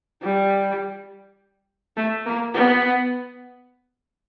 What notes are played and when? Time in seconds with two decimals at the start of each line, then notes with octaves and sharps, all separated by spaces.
0.22 G3
1.96 A3
2.25 A#3
2.54 B3